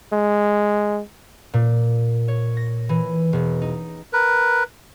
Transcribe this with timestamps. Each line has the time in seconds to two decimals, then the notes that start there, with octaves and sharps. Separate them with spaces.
0.13 G#3
1.54 A#2
2.28 C#5
2.57 A#6
2.89 E3
3.33 E1
3.62 D#4
4.13 A#4 B4